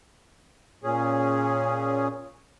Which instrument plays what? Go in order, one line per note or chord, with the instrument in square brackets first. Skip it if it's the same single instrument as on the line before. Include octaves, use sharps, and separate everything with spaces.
[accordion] A#2 C#4 G#4